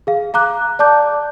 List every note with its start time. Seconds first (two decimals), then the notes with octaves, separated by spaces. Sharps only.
0.07 G#4 F5
0.34 F5 A#5 D6 F#6
0.79 D5 A5 D6 G6